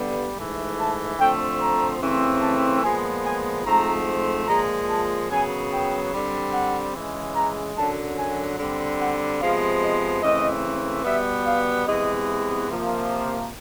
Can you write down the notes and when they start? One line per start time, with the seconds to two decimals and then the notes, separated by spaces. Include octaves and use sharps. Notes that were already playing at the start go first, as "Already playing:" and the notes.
Already playing: G2 D3 G3 B3
0.36 G#2 E3 A3
0.77 A5
1.18 D3 F3 A3 C4 G5
1.59 A#5
2.00 C#3 E3 A3 C4
2.42 A5
2.82 A#2 F3 G#3 B3 G#5
3.23 G#5
3.64 G#2 F3 A3 C4 A#5
4.47 A#2 F3 G#3 A#5
4.88 A5
5.29 F#2 C#3 F#3 B3 G#5
5.70 G5
6.11 D3 G3 C4
6.52 F#5
6.93 C#3 E3 G#3
7.34 A#5
7.75 F#2 D3 F#3 A5
8.16 G#5
8.58 D3 G3 C4
8.98 F#5
9.39 C3 F3 G#3 B3 F5
9.80 D#5
10.22 C#3 E3 A3 C4 D#5
11.03 B2 G3 B3 E5
11.45 F5
11.85 C3 E3 G#3 B3 D#5
12.68 C3 F3 A#3